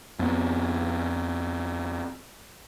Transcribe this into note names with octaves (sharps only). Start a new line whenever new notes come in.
F2 B3